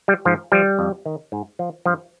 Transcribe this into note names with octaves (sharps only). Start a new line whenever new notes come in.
G3
G#2 F3
F3 G3
F2
D#3
G#2
F3
G2 F3